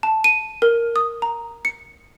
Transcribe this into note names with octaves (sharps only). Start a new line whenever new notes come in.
A5
D#7
A#4
D#6
A#5
C#7